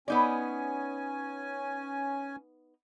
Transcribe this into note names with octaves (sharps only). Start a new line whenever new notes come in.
B3 C#4 D#4 D5 G#5